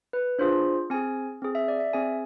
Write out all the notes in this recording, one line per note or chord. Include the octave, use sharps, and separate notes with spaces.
B4
D4 F4 G#4 C5
C4 G#4 G#5
C4 G#4
E5
D5
E5
C4 G#4 G#5